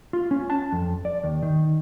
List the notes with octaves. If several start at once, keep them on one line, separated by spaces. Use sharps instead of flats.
F4
C#4
A5
F2
D5
D#2
D#3